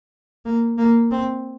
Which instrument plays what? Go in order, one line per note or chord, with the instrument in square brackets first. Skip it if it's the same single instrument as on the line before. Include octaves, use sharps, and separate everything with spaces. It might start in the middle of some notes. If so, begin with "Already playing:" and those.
[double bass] A#3
A#3
C4